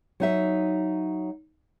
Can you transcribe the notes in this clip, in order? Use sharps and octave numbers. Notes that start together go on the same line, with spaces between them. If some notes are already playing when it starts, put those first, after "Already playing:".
F#3 D#4 E5